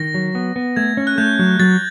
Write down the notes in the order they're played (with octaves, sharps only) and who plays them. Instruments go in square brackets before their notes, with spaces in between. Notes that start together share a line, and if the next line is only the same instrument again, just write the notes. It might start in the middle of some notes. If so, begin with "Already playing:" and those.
Already playing: [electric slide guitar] D#3 [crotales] A#6
[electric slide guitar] F#3
B3
B3
[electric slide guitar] A3 [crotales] G#6
[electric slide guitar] C#4
[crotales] F#6
[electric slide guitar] A3 [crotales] G6
[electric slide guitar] F#3
[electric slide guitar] F#3 [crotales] A6